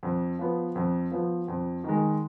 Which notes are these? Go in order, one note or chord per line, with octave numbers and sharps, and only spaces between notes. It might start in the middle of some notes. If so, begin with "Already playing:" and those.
F2
F3 B3
F2
F3 B3
F2
D#3 G#3